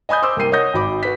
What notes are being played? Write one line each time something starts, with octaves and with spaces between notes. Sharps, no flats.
D#5 G#5 B5 D#6 G6
C5 C6 D6 E6
C2 A#3 A#4 G5 C7 D#7
C#5 D#5 F#5 D#6 G6 A#6
G#1 F#4 B5 D6
F#4 B4 B6